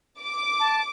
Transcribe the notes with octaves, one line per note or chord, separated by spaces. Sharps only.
D6
A5